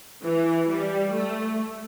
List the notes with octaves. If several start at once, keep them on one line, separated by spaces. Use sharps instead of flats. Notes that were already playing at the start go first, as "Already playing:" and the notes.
E3
G3
A3